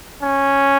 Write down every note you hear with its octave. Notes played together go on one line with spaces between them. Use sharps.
C#4